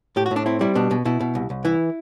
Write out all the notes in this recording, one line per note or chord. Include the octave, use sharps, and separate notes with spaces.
A2 G4
F#4
A2
D4
C4 E4
G3 E4
B2 D4
B2
B2 E4
B2
C2
C2
E3 E4